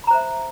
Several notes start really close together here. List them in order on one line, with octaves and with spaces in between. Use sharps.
B5 A#5 C5 E5